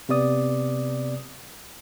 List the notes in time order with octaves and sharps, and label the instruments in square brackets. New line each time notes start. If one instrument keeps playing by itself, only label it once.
[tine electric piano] C3 B3 D5 D#6